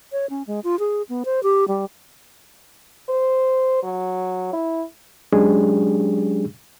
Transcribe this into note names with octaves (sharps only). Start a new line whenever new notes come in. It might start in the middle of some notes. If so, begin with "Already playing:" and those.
C#5
C#4
G#3
F4
G#4
B3
C5
G4
G3
C5
F#3
E4
F#3 G#3 C#4 D4 G4 G#4